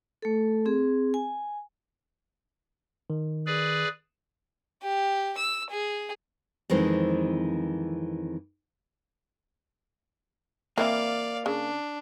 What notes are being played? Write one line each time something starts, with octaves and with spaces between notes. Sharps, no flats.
A3 A4
C4 G#4
G#5
D#3
G#4 B4 D5
G4
E6
G#4
F2 D#3 E3 G#3 C4
E3 A#3 C4 E4 D5 F5
C#3 D4